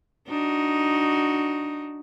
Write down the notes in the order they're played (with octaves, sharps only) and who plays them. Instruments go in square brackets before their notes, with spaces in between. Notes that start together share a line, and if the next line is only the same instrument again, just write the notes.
[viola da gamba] D4 D#4 F#4